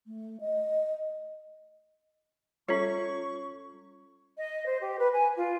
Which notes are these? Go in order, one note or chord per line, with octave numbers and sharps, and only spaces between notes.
A3
D#5
G3 C#4 F4 A4 C#5 C#6
D#5
C5
G4
B4
G#5
F4